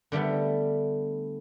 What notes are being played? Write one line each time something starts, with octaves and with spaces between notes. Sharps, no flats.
D3 G3 A3 B3